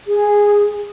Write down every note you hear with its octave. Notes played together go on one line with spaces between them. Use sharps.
G#4